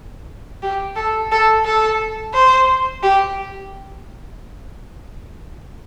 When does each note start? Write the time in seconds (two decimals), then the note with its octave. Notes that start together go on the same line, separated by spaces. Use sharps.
0.63 G4
0.96 A4
1.32 A4
1.65 A4
2.34 C5
3.03 G4